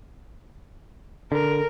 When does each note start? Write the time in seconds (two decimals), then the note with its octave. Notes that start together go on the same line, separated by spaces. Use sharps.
1.32 D3 A#4